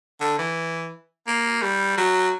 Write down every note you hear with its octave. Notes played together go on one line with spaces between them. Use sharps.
D3
E3
A#3
G3
F#3